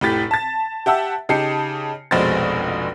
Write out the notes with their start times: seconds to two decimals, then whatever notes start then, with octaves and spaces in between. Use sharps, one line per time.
0.01 F1 A2 G4 A6 B6
0.31 A5 A6
0.86 G4 E5 F#5 A5 E6
1.29 C#3 D#4 G4 A5 C7 C#7
2.11 F1 A#1 B2 G#3 C5 A6